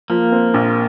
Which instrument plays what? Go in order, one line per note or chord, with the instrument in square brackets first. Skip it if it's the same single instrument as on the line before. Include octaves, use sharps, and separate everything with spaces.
[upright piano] F3 [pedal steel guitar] A#3
[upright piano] C4
A#1